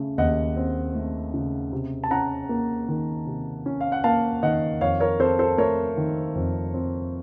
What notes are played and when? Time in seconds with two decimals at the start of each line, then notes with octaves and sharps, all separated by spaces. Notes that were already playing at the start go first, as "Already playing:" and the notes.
Already playing: C#3 A3
0.18 D#2 D#5 F#5
0.57 C4
0.95 A3
1.34 C#3
1.72 C3
2.04 A5
2.11 C#4 F#5 A#5
2.49 A#3
2.88 D#3
3.27 C3
3.66 C#4
3.81 F5
3.92 F#5
4.04 A#3 F5 A5
4.43 D#3 D#5 F#5
4.81 F2 C#5 F5
5.00 A#4 C#5
5.20 C4 A4 C5
5.39 A4 C5
5.58 A3 A#4 C#5
5.97 D#3
6.35 F2
6.74 C4